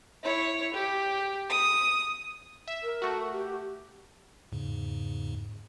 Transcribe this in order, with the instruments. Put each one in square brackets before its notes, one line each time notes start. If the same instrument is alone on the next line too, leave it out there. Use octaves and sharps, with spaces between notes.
[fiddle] E4 C#5
G4
D#6
[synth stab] E5
[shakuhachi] A#4
[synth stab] A3 F#4
[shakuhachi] G4
[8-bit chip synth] E2 G#2 C#3